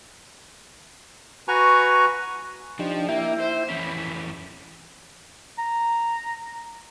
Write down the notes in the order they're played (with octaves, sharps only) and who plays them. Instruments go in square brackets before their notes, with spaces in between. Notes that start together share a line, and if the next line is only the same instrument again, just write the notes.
[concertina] F#4 B4 G#5 A#5 C#6
[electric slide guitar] F3 [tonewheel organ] D4 D#4 G4
[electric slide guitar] A#3 [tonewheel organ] E4 E5 G5
[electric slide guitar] C5
[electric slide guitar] F2 E3 C#4 [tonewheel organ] B5
[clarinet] A#5